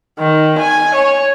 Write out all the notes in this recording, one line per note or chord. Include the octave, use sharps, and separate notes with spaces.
D#3
G#5
C#5